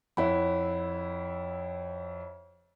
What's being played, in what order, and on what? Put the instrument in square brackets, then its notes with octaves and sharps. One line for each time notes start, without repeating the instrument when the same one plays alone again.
[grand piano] F2 E4 [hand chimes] C#5 F#5 B5